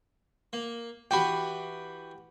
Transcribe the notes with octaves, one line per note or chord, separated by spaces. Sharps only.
A#3
E3 F#4 G4 G5 B5